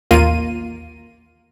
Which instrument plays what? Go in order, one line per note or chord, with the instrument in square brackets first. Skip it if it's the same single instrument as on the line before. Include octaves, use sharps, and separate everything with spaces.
[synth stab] A1 D#2 A#3 F4 D#7